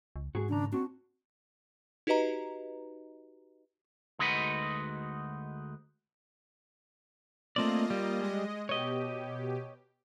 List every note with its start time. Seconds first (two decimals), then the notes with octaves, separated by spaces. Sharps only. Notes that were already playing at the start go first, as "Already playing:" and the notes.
0.16 C#2
0.35 G#2 F#4 G#4
0.49 D#2 C#3 D4 A#5
0.73 C4 D4 F#4
2.07 D#4 F#4 G4 B4 D#5 A#5
4.19 D2 G#3 D#4 F#4 B4
7.56 A3 A#3 C4 F4 D5 D#5
7.90 G3
8.21 G#3 D#5
8.69 B2 G4 C#5 D#5